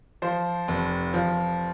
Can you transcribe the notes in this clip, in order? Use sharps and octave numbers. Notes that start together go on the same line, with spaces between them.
F3 C5
F1
F3